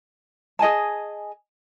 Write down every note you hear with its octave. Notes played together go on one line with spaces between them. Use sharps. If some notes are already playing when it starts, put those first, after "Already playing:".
G#4 D#5 G#5 A5